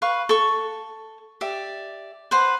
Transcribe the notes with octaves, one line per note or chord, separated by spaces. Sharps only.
B4 F5 C#6
A4 C#6
G4 D5 E5
B4 C5 F#5